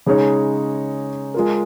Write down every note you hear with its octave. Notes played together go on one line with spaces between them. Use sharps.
C#3 G#3 D#4 G#4 C#5
G#3 F4 A#4